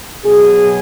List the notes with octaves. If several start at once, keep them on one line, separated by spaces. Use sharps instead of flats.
B2 F#3 G#4